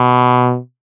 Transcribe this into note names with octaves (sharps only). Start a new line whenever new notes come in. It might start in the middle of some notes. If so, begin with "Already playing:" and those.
Already playing: B2